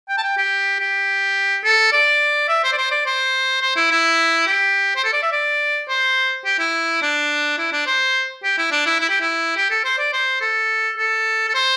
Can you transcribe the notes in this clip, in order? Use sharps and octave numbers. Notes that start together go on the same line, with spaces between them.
G5
A5
G5
G4
G4
A4
D5
E5
C5
D5
C5
D5
C5
C5
E4
E4
G4
C5
A4
D5
E5
D5
C5
G4
E4
D4
E4
D4
C5
G4
E4
D4
E4
E4
G4
E4
G4
A4
C5
D5
C5
A4
A4
A4
C5